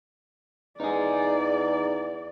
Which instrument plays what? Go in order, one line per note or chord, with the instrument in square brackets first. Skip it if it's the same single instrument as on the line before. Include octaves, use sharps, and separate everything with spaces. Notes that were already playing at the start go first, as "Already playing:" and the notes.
[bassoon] E2 [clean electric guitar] D#4 G#4 [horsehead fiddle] D5